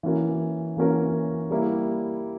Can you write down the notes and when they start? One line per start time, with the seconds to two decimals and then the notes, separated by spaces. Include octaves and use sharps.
0.03 E3 A#3 C#4 F#4 A#4
0.77 E3 A#3 C#4 F#4 A#4
1.50 G3 A#3 E4